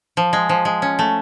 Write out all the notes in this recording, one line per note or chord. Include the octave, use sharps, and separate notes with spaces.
F3
G#3
F3
G#3
C#4
A3